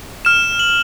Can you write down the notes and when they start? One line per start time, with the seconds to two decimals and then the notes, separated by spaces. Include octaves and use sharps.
0.25 F6 E7
0.59 F#7